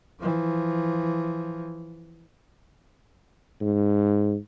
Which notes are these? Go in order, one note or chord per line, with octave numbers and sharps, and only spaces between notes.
E3 F3
G#2